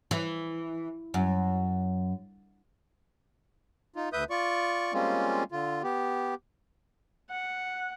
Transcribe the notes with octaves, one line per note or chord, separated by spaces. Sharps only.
E3
F#2
D#4 F4
D2 B4 E5 D#6 G6
F4 D5 C#6
G3 G#3 A#3 C4 C#4 F4
D3 F4
B3 G4
F#5